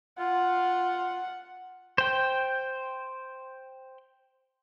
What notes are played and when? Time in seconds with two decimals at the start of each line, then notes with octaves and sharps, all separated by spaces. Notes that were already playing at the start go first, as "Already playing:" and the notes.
0.19 F4 F#5
1.98 C5 G5